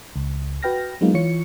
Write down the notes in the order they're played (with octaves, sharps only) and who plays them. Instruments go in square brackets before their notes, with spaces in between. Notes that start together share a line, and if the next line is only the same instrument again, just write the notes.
[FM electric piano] C#2
F#4 B4 G5 F6 A#6
F#3 G#3 A#3 B3 D#4 F4
E3 F4 C#5 C#7